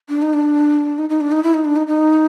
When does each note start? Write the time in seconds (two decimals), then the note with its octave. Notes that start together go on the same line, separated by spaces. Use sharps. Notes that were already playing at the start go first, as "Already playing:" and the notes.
0.09 D4
0.22 D#4
0.33 D4
0.98 D#4
1.09 D#4
1.20 D4
1.31 D#4
1.43 E4
1.54 D#4
1.65 D4
1.76 D#4
1.87 D#4